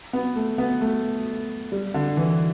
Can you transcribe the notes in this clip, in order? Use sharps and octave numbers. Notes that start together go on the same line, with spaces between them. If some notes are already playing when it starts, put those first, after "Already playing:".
B3
A3
B3
A3
G3
D3
E3